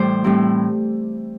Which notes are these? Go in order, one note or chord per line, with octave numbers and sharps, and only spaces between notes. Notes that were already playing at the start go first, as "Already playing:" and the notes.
Already playing: A2 E3 G3 C5 D5
A2 G3 C4 E4